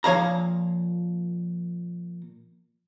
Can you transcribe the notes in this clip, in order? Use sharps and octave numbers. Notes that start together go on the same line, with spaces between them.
A#2 F3 C#5 F5 A#5